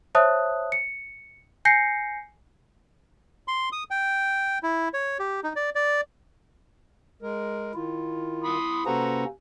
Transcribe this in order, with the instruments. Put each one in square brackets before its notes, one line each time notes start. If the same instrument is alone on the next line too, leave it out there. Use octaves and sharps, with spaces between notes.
[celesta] C5 C#5 E5 A5 D#6 F#6
C#7
G#5 G6 A#6 C7 C#7
[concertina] C6
D#6
G5
E4
C#5
G4
D#4
D5
D5
[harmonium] G#3 A#4
[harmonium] D#3 F4 [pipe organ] E4
[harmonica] B5 C6 D#6
[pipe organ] C3 A#3 C#4 [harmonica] F#4 A#5 [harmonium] A4 B4 C5